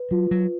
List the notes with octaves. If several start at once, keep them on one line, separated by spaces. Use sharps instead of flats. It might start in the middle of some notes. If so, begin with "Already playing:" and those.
Already playing: B4
F#3 F4
F#3